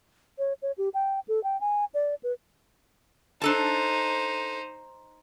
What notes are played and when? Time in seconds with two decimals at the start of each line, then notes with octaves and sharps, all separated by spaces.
0.39 C#5
0.62 C#5
0.78 G4
0.94 G5
1.28 A4
1.44 G5
1.61 G#5
1.94 D5
2.23 B4
3.42 D4 D#4 A4 C5 A5